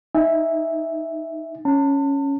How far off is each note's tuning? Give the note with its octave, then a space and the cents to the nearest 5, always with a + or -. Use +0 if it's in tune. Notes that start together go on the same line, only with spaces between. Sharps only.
D#4 +0 E5 +0 G#5 -15
C#4 +0 A5 +40